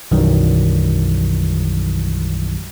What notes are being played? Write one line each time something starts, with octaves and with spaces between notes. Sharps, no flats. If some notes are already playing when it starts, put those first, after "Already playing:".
B1 F#2 D#3 E3 F#3 G3